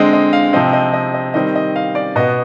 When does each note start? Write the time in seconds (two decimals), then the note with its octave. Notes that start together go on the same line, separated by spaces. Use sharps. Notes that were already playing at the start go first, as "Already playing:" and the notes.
Already playing: D3 G#3 C4 D#5
0.13 D#5
0.33 F5
0.53 C3 F3 C4 D#5
0.73 D#5
0.93 D#5
1.14 D#5
1.34 D#3 G3 C4 D#5
1.55 D#5
1.76 F5
1.95 D5
2.16 B2 B3 D#5